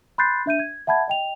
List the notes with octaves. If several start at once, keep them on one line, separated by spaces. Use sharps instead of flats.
B5 C6 F#6 G6 A6 C7
D4 E5 G6 D#7
G#6
E5 F#5 A5 B5 G#6
D#5 G5 F7